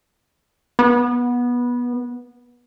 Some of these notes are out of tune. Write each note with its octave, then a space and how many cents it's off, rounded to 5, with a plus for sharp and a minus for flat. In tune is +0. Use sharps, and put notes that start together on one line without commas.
B3 -20